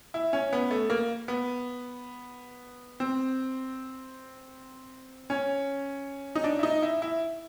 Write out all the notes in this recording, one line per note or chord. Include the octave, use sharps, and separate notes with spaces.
E4
C#4
B3
A3
A#3
B3
C4
C#4
D#4
D4
E4
D#4
E4
E4